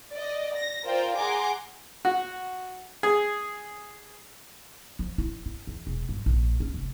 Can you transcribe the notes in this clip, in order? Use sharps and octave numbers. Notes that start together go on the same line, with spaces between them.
D5 D#5
A#6
F4 A#4 C5 D5 F5 G5
G#4 F#5 G#5 A#5 C6 D6
F#4
G#4
F3
E4
E4
E2
E1
G1
A#1
C#4
F1